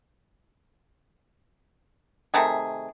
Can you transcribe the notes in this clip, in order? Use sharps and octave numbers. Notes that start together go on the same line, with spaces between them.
C3 D#3 A3 G#4